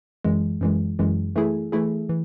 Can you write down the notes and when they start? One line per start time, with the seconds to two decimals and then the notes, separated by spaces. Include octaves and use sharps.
0.24 F#2 E3 G#3
0.61 F#2 E3 G#3
0.99 F#2 E3 G#3
1.36 E3 A3 E4 G#4
1.72 E3 A3 E4 G#4
2.09 E3